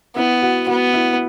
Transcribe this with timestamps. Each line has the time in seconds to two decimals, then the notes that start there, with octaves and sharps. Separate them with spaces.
0.16 B3 E4
0.42 F#4
0.67 B3 F#4
0.93 E4